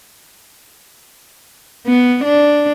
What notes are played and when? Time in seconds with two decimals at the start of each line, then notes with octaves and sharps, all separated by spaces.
1.87 B3
2.25 D4